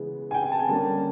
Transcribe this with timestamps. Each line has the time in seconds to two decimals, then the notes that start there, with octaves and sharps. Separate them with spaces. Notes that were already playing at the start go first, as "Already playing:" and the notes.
Already playing: C#3 E3 G#3 B3
0.31 G#5
0.34 G5
0.43 G#5
0.52 A5
0.59 G#5
0.69 D3 G3 A#3 C#4 A5